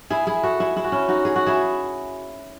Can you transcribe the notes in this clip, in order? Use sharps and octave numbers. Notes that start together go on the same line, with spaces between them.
E4 G#4
E4 G#4
F#4 A4
E4 G#4
E4 G#4
F#4
C#4 E4
D#4 F#4
G#4
F#4
E4 G#4